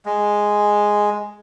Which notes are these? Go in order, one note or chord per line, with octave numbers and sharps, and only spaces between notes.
G#3